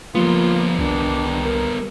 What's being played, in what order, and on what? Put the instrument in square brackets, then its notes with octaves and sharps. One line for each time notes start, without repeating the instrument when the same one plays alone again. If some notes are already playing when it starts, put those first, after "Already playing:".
[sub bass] F3 [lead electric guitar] G3 B3 [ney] A#3 [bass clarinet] F4
[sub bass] C2 [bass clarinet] D#3 [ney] D4
[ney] A#4